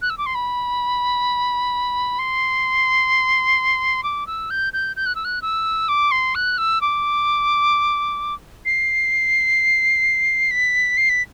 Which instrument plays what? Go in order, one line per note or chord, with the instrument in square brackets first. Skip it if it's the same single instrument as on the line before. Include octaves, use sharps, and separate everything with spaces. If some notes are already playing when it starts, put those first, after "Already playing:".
[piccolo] F#6
E6
D6
C6
B5
C6
D6
E6
G6
G6
G6
F#6
E6
F#6
E6
D6
C6
F#6
E6
D6
C7
B6
C7
B6